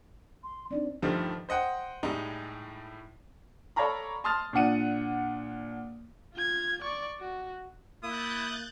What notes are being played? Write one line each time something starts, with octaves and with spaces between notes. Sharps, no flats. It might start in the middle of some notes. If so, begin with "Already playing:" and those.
C6
C4 D4 D#4 D5
G2 D3 D#3 F3 G3 A3
C5 D#5 F#5 G5
A2 G3 G#3 D#4
A4 C#5 D5 F5 A#5 B5
A5 C6 D#6 F6 A6
A#2 D4 F#5 D#7
F4 G#6
D5 C#6
F#4
A#3 E4 D#6 F#6 G6 A6